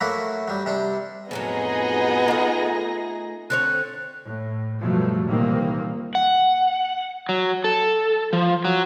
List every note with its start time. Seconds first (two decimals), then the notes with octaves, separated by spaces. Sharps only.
0.01 F#3 A3 A#3 E4 F#4
0.48 F#3 G3
0.66 C3 G3 D4
1.31 F2 A2 F#3 B3 D#4 G#4 D#5 A#6
2.28 A3 F4
3.50 D3 C4 C#5 F#6
4.25 A2
4.79 G2 B2 F3 F#3 A3
5.26 C2 A#2 D#3 E3 A#3 C4
6.15 F#5
7.29 F#3
7.64 A4
8.33 F3
8.65 F#3